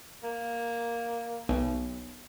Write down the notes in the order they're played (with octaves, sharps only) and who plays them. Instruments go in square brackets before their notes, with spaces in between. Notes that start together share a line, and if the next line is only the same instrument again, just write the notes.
[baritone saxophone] A#3
[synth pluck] B1